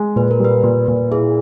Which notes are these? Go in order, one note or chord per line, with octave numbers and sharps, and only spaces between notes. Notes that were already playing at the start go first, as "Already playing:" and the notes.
Already playing: G#3
A#2 B4
A#4
G3 B4
A#2
A#2
E4 G#4